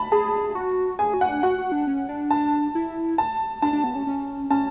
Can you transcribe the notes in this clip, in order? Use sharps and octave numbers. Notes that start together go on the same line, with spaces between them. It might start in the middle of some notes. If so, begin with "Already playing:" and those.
Already playing: A5 B5
G#4 A5
F#4
G#4 G#5
F#4
F#5
D4
F#4 F#5
F#4
D4
C#4
D4
A5
E4
A5
D4 A5
D4
B3
C#4
C#4
C#4 A5